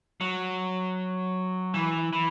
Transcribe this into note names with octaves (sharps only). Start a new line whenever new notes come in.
F#3
E3
E3